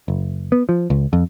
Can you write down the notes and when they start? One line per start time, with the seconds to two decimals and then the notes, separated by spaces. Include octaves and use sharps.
0.08 F#1
0.52 B3
0.69 F3
0.90 C#2
1.13 F2